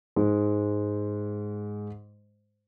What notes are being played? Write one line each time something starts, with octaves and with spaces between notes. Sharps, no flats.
G#2 G#3